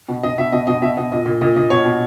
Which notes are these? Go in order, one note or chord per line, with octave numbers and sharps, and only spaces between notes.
B2
B2 D#5
B2 E5
B2 D#5
B2 D#5
B2 E5
B2 D#5
A#2 D#5
A#2
A#2 D#5
A#2 D#5
B2 C#5
B2